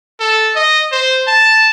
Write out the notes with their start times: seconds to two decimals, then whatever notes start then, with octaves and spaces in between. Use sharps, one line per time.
0.20 A4
0.56 D#5
0.92 C5
1.27 A5